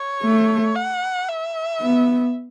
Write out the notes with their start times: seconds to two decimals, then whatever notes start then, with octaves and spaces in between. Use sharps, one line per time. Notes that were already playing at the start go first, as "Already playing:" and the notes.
Already playing: C#5
0.24 A3
0.76 F#5
1.29 E5
1.81 B3